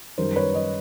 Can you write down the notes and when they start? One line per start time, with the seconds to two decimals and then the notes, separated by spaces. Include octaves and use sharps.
0.18 F#2 D#3 G3 A#4 C5
0.36 B4 C#5
0.54 C#5 D#5